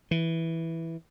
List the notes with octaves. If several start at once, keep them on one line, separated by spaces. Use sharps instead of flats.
E3